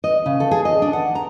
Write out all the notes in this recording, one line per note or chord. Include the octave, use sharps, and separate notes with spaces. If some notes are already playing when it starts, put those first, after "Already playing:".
D#5
C#3
A4
G#4
D#5
D4
F#5
A#5